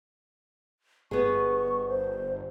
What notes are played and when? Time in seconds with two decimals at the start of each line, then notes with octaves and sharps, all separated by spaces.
1.11 G1 B3 G#4 C#6
1.88 C5